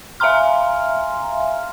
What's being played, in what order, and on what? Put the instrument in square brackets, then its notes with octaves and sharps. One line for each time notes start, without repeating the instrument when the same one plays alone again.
[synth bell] E5 F5 G#5 A#5 C6 F6